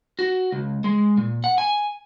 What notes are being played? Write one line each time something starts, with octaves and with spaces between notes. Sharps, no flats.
F#4
C#2
G#3
A#2
F#5
G#5